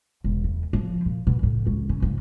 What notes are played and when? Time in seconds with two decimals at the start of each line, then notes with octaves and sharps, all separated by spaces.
0.24 E1
0.44 E2
0.73 F3
1.06 A#2
1.27 B2
1.43 A2
1.67 C#2
1.89 C#4
2.02 G#2